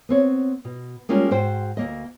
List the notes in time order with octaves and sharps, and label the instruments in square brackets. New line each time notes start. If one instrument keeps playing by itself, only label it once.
[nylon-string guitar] B3 C4 C#5
B2
G3 G#3 A#3 C#4 F4
G#2 F#4 C5 G5
D2 A#3 D#5